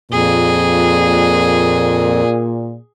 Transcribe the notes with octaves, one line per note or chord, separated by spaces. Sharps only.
F2 A#2 G#4